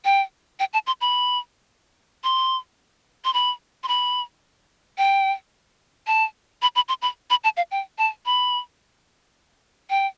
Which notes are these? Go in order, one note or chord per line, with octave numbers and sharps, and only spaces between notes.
G5
G5
A5
C6
B5
C6
C6
B5
C6
B5
G5
A5
B5
B5
C6
B5
B5
A5
F5
G5
A5
B5
G5